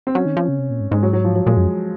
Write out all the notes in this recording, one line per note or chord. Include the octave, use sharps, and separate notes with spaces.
C4
F#3 C#4
D#3
F3
C#3
C3
A#2
G#2
G#2 G#3
F#3
F#3
F3
F#3
A#2 G#3
F#2